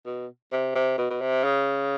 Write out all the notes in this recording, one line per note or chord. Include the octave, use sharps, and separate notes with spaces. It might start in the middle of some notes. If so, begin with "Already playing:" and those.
B2
C3
C3
B2
B2
C3
C#3